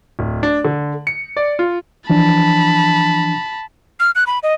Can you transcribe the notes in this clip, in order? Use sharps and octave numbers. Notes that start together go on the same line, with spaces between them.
D1
D4
D3
C#7
D5
F4
E3 F3 D4 A5 B5
F6
F#6
B5
D#5